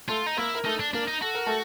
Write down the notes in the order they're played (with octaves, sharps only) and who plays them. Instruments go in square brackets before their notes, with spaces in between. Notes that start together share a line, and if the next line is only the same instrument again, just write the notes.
[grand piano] A3 A4 [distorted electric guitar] F4
[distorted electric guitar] D#4
[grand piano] A#3 A#4 [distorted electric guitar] E4
[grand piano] A#4
[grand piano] A3 A4 [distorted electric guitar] D#4
[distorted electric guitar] D4
[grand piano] A#3 A#4 [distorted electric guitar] D4
[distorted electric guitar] D#4
[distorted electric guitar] F#4 [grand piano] A4
[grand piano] A#4
A3 A4